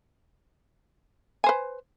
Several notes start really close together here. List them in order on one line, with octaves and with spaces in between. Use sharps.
G#5 C5 B4